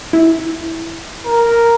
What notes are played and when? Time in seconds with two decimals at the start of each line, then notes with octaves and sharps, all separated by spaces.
0.13 E4
1.26 A#4